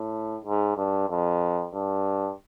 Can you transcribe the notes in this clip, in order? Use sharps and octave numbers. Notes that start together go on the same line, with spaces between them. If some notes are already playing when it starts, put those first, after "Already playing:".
Already playing: A2
G#2
G2
F2
G2